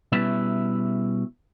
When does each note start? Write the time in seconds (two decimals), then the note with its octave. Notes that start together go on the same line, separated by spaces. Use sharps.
0.12 B2 G3 C#4 E4 B4 E5